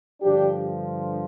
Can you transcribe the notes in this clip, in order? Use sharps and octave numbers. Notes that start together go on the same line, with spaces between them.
G2 D3 F3 D4 G4